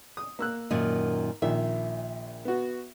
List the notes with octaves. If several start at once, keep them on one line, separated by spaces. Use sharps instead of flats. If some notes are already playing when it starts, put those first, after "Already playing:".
D#6
A#3 E6 F#6
F#2 A#2 D#3
A#1 A#2 D#3 E5
B3 F#4